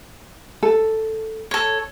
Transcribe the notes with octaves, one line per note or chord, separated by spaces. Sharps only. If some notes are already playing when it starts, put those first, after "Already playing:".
A4
A4 C#5